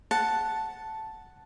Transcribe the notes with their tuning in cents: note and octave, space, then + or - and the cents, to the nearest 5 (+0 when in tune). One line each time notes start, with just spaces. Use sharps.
F#5 +0 A5 +0